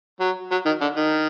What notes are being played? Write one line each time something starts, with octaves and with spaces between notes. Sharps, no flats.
F#3
F#3
D#3
D3
D#3